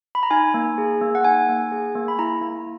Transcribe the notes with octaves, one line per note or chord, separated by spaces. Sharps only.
B5
A#5
D#4 G#5
A#3
G#4
A#3
F#5
D#4 G#5
A#3
G#4
A#3
B5
E4 A#5
A#3